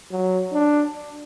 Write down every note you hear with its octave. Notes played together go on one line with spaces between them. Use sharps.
F#3
D4